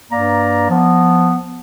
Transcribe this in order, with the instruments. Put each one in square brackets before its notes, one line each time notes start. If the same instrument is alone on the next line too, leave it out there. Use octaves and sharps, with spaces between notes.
[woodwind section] G2 A#3 D5 A#5
F3 B3